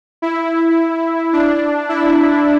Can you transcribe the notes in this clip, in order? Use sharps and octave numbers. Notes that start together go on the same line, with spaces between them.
E4
D4
E4